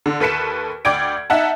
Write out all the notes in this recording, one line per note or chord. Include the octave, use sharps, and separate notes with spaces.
D3
D#2 A4 B4 B6 C#7 E7
D2 D5 G5 G#6 D7
D#4 E5 F#5 A5